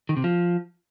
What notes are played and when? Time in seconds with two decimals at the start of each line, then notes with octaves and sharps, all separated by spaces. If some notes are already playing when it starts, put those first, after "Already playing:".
0.09 D#3
0.17 C3
0.24 F3